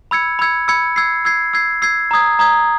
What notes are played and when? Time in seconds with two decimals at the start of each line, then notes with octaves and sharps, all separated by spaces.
0.11 B5 E6 G#6 C#7
0.39 B5 E6 G#6 C#7
0.68 B5 E6 G#6 C#7
0.96 E6 G#6 C7
1.25 E6 G#6 C7
1.53 E6 G#6 C7
1.82 E6 G#6 C7
2.11 A#5 D#6 G#6
2.39 A#5 D#6 G#6